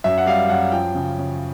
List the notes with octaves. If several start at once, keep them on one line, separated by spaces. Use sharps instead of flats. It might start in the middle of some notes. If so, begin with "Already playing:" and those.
F#2 E5
F#5
G3 F5
F#2 F#5
F3 G5
C#3
C#3